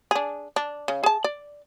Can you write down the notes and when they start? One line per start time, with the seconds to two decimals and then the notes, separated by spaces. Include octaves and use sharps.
0.11 D4 G#4
0.56 D4
0.88 C#3
1.04 G#4 A5
1.24 D5